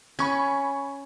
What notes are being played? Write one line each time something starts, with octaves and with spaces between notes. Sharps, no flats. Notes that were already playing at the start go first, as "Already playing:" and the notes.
C#4 B5 C#6 G#6